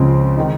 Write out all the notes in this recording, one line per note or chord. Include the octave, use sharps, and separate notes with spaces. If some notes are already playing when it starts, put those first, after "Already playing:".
Already playing: C#2 C#3 F3 G#3 C4
D#3 G#3 D#4